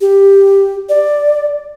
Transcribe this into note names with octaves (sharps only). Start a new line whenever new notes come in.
G4
D5